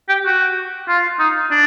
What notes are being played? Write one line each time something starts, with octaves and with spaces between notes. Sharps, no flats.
G4
F#4
F4
D#4
D4